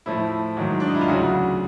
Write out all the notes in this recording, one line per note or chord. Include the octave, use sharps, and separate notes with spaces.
A2 F3 A3 E4
G#2 D#3 F#3
D4
D#4
E4
F4
D2 C#3 F#3 F#4